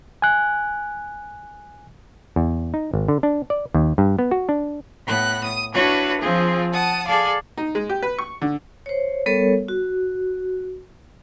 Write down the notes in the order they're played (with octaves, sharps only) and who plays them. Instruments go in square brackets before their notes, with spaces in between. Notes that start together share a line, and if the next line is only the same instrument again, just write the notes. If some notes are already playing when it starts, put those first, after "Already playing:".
[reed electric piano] G#5 F#6
[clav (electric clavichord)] E2
D#4
G#1
D3
D4
D5
D#2
G2
B3
F#4
D4
[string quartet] A2 B3 F#6
D#6
D4 E4 F#4 B4 C#5
F3 C4 F4 G#4
F#5 A5 D#6
G#4 A4 D5 F5
[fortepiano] D#4
G#3
G4
B4
C#6
D3
[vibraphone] C5 C#5
G3 B3 A4 A#4 C#5
F#4